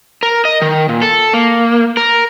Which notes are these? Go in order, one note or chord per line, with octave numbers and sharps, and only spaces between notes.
A#4
D#5
D#3
A#2
A4
A#3
A#4